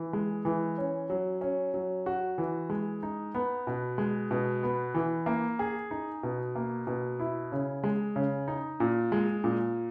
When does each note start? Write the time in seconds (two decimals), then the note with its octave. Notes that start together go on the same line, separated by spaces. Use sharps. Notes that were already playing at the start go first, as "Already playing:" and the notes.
Already playing: E3
0.13 G#3
0.45 E3
0.78 C#4
1.10 F#3
1.41 C#4
1.74 F#3
2.06 F#4
2.38 E3
2.70 G#3
3.03 D#4
3.35 B3
3.67 B2
3.98 G#3
4.31 B2
4.63 B3
4.94 E3
5.26 A#3
5.59 G#4
5.91 D#4
6.23 B2
6.55 A#3
6.87 B2
7.19 E4
7.52 C#3
7.83 G#3
8.16 C#3
8.48 D#4
8.80 A#2
9.12 G#3
9.44 A#2